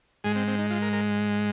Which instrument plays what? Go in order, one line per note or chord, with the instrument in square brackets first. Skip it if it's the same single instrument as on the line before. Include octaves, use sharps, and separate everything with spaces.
[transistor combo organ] G#2 G#3 G#4
C4
C4
D#4
F4
A#4
A#4